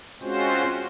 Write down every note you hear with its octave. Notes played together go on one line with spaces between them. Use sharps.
G#3 C4 C#4 F4 F#4 C5